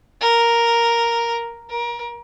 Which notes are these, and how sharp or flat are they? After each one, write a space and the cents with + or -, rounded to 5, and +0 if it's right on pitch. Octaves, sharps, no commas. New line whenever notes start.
A#4 +0
A#4 +30